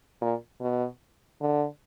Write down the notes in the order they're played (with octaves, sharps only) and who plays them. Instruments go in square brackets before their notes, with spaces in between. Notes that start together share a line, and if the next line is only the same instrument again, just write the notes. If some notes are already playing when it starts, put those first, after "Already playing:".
[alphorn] A#2
B2
D3